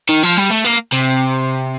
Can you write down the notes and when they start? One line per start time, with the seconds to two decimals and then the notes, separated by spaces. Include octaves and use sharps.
0.09 D#3
0.23 F3
0.37 G3
0.50 A3
0.64 A#3
0.93 C3